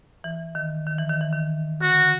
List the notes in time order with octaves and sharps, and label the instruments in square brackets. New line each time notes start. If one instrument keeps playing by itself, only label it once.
[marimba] E3
D#3
D#3
E3
D#3
E3
D#3
[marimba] D3 [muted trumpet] F#4